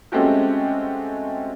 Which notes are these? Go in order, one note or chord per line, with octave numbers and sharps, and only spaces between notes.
G#3 A3 C4 C#4 F#4 G4